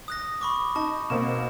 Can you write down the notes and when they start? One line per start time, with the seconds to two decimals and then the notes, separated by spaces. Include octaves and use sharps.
0.08 D#6 F#6 A#6
0.41 B5 C#6 D6
0.76 D#4 A5
1.10 B2 A#3 C4 E7